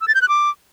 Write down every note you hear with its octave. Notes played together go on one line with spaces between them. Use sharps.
E6
A6
G6
F#6
D6